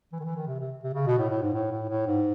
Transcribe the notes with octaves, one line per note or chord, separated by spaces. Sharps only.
E3
D#3
E3
D#3
C3
C3
C3
C#3
B2
A2
A2
G#2
A2
A2
A2
G#2